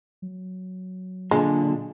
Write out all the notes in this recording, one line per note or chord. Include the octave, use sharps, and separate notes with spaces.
F#3
A#2 D3 G#3